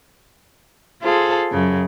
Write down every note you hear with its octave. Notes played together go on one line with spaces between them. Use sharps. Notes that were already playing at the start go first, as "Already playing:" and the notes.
F4 G#4 A4 C5
F#2 C#3